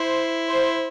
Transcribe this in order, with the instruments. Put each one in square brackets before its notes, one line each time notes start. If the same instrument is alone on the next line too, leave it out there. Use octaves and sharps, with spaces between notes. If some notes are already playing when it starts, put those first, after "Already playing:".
Already playing: [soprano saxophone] E4 [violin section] C5
[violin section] C5